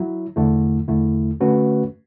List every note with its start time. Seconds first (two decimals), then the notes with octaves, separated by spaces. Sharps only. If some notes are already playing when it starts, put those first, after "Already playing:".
Already playing: F#3 E4
0.36 E2 D3 A3 E4
0.88 E2 D3 A3 E4
1.41 D3 A3 C#4 F#4 B4